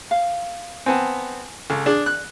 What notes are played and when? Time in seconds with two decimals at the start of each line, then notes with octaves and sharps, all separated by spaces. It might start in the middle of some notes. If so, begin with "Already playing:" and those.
0.11 F5
0.86 B3 C4 G#5 A5
1.70 C#2 A4
1.86 D4 G#4 D5
2.06 F#6